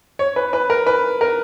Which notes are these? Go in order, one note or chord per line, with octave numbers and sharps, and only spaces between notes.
C#5
B4
B4
A#4
B4
A#4